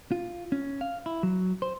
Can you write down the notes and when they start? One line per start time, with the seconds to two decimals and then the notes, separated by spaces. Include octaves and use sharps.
0.12 F4
0.52 C#4
0.81 F5
1.06 E4
1.23 F#3
1.62 C5